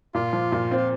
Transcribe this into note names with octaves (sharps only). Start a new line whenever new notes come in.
A#2 F4
F3
A#2
C4
F4